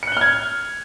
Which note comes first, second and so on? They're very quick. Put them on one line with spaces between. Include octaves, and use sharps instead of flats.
C#7 F#6 G7 F6 G#6